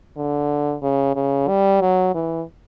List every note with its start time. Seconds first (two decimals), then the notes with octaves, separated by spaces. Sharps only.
0.16 D3
0.82 C#3
1.15 C#3
1.48 G3
1.81 F#3
2.14 E3